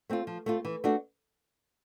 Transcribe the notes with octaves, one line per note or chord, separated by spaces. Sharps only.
A3 C4 F4
F3
A3 C4 F4
E3
A3 D4 F#4